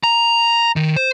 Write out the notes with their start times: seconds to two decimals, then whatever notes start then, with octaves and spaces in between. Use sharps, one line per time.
0.04 A#5
0.76 D#3
0.96 C5